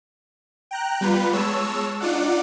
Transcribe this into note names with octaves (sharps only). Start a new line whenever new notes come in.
G5 A#5 F#6
G3 B3 F4 B4
G#3 C#5 A5 E6
D4 D#4 F4 D5 F#5